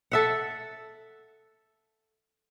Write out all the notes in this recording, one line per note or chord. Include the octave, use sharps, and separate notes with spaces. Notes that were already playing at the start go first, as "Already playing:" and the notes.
A4 E5 F#5